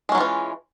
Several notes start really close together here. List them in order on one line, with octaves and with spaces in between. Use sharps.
G#3 C#4 F#3 F4 E3